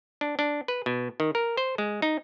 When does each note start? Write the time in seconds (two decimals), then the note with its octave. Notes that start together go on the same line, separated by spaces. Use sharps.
0.21 D4
0.39 D4
0.68 B4
0.86 B2
1.20 D#3
1.35 A#4
1.57 C5
1.78 G#3
2.02 D#4